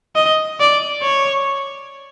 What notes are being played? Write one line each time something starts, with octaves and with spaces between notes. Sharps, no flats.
D#5
D5
C#5